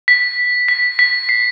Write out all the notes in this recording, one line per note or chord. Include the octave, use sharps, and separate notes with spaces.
B6
B6
B6
C7